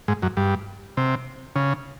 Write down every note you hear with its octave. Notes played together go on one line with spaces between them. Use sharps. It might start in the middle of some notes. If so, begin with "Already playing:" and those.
G#2
F#2
G2
C3
C#3